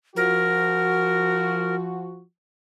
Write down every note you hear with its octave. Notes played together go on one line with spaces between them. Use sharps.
F3 F#4 A#4